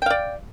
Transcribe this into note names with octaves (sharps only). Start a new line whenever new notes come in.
D5 F5 G5